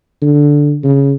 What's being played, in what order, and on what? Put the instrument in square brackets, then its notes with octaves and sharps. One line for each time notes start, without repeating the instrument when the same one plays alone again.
[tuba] D3
C#3